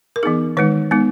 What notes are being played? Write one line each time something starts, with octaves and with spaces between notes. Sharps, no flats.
A#4
E3 B3 D#4 G#4
D#3 G#3 D#4 B4
G#3 B3 D#4